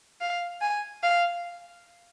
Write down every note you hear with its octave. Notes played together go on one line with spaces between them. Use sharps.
F5
G#5
F5